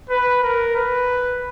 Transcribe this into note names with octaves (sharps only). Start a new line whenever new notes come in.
B4
A#4
B4